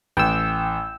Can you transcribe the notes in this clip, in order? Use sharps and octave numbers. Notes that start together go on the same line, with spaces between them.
A1 G5 E6